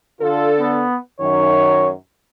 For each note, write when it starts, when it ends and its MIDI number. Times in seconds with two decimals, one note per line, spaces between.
0.21 0.83 50
0.21 0.52 65
0.21 0.83 69
0.59 0.97 59
1.20 1.91 42
1.20 1.91 51
1.20 1.88 73